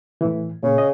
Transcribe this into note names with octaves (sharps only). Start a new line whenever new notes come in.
A2 E3
A#2 C#3
D#5